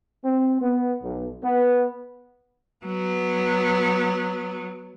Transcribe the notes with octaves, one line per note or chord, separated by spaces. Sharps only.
C4
B3
B1
B3
F#3 B3